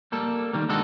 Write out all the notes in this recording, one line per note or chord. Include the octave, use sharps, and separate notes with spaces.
G3 A#3 A4
D#3 G3 A#3
G#3 D4 D#4 F#4 A4